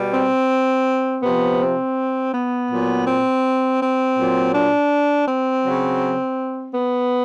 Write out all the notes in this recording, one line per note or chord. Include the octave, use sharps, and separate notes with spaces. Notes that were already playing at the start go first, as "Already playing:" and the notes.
Already playing: B2 G3
C4
C3 F3 B3
C4
B3
A#2 F#3
C4
C4
A#2 F#3
D4
C4
C#3 F#3
B3